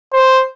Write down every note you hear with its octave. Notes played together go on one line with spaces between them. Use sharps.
C5